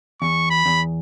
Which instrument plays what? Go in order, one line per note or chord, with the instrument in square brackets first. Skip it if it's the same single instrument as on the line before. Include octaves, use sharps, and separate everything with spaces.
[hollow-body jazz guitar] E2 [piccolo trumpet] C#6
[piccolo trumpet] B5
[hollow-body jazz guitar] E2